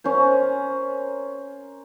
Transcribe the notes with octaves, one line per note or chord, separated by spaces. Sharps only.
C#4 A#4 C5